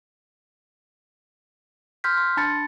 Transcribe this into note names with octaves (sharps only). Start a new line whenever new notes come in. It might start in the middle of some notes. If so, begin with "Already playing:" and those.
C6 F6 G6 B6
C6
D4 A5 B5 A6 C#7